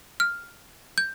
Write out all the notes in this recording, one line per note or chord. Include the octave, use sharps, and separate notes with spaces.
F6
G6